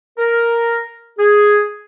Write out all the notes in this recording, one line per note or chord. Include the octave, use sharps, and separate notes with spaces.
A#4
G#4